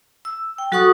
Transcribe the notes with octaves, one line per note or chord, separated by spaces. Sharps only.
E6
G5
F#3 F#4 A4 F#5 C#6 D#6